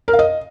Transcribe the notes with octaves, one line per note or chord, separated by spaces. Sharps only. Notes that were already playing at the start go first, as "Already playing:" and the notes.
A#4
F5
D#5